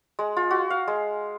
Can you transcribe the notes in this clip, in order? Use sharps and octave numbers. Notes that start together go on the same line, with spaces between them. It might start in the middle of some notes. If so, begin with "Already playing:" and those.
G#3
F4
F#4
F5
G#3